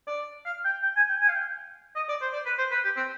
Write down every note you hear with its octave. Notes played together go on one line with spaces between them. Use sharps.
D5
F5
G5
G5
G#5
G5
G#5
F5
G5
D#5
D5
C5
D5
B4
C5
B4
G4
C4